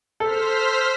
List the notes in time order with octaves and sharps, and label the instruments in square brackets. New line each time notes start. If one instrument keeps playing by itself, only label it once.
[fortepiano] A4 [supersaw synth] C5 F6 B6